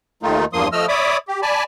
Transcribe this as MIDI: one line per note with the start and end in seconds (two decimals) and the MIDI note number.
0.23 0.45 39
0.23 0.45 51
0.23 0.45 57
0.23 0.45 63
0.23 0.45 65
0.53 0.68 40
0.53 0.68 43
0.53 0.68 53
0.53 0.68 58
0.53 0.68 84
0.53 0.68 87
0.72 0.86 53
0.72 0.86 57
0.72 0.86 75
0.72 0.86 88
0.72 0.86 89
0.88 1.17 73
0.88 1.17 74
0.88 1.17 76
0.88 1.17 83
0.88 1.17 86
0.88 1.17 87
1.28 1.40 67
1.42 1.63 74
1.42 1.63 80
1.42 1.63 81
1.42 1.63 83